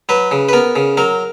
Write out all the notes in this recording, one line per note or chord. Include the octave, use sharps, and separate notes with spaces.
F#3 B4
C#3
B4
B3 A#4
C#3
F#3 A#4